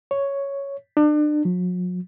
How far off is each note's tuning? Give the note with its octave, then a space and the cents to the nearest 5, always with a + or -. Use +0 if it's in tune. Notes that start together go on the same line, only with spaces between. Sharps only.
C#5 +0
D4 +35
F#3 -45